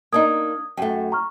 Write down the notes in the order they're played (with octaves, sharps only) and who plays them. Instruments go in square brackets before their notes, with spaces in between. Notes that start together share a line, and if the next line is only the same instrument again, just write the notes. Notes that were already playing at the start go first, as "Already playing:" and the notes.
[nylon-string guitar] A#3 D4 D#4 [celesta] D#6 G#6
[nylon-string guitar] F#2 A3 [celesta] G5
[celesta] A#5 C#6 F6